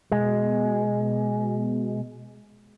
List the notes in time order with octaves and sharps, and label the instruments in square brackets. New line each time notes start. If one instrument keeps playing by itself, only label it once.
[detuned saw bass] B2 [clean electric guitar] G#3